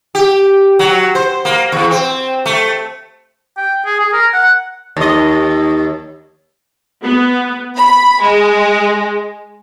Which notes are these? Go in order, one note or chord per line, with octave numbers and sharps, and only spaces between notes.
G4
F#3
C5
A#3
E2
C4
A3
G5
G#4
G#4
A#4
F#5
D#2 D#5
B3
B5
G#3